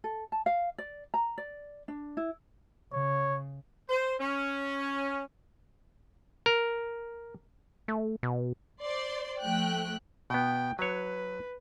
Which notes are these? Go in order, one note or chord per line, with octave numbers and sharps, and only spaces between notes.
A4
A5
F5
D5
A#5
D5
D4
E4
C#3 C#5
C5
C#4
A#4
A3
B2
C5 D5 C6
F3 A3 G5 F#6
B2 B3 G5
F#3 B4 C#5